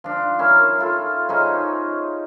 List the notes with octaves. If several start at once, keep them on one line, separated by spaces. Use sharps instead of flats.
F3 D4
C#4 E4 A#4
E4 F4 A4
C#4 D#4 G#4 C5